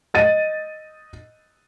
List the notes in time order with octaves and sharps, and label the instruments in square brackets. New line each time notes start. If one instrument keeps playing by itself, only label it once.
[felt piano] D#5 A6 D#7